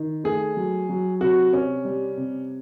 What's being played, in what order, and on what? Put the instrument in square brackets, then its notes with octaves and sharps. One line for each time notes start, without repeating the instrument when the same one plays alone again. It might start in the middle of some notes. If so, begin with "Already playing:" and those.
Already playing: [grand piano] D#3
[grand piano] A3 [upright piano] G#4
[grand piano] F#3
F#3
[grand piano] C3 [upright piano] F#4
[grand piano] C3 [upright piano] C#4
[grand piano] G3
C3